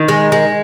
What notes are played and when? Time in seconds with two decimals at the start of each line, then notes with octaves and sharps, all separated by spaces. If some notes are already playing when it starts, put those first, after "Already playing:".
Already playing: D#3
0.08 G#3
0.32 G#3